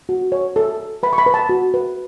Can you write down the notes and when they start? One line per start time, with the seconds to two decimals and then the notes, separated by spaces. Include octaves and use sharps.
0.09 F#4
0.32 C#5
0.56 A4
0.80 A4
1.03 B4 B5
1.13 C#6
1.18 B5
1.26 B4
1.34 A5
1.49 F#4
1.74 B4